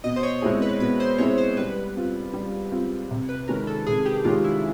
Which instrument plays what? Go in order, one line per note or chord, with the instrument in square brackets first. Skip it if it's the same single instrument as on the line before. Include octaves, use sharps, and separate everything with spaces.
[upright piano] B2 [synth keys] D#5
[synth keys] C5
C#5
[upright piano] G#3 C4 E4 G#4
[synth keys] B4
[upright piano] B2 [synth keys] B4
[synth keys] C5
[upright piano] G#3 C4 E4 G#4 [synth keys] C#5
[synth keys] C5
[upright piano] G3 [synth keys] B4
[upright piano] C4 F4
G3
C4 F4
C3
[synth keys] B4
[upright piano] D#3 G#3 C#4 [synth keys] A#4
[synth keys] A4
[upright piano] C3 [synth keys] G#4
[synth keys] G4
[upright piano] D#3 G#3 C#4 [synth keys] F4
[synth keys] E4